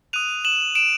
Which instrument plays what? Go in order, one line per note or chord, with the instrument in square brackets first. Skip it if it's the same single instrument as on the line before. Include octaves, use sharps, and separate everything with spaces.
[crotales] D#6 F#6 D#7 F7
E7 F#7
D7 E7